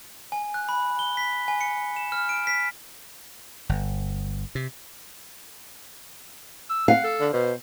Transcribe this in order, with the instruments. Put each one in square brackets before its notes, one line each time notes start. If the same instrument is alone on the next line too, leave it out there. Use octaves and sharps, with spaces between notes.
[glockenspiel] G#5
F#6
B5
G7
B6
G#5
C#7
E7
F6
D7
B6
[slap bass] G1
C3
[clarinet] E6
[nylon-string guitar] F5 [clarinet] F#5
[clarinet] A4
[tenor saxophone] D3
[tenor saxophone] B2 [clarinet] C5